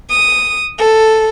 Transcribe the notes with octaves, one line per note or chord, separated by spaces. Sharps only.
D#6
A4